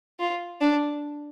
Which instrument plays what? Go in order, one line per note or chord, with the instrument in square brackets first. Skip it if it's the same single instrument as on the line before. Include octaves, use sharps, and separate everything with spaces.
[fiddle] F4
D4